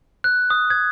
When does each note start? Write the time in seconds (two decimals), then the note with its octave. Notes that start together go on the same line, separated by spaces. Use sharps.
0.24 F#6
0.50 D#6
0.70 G#6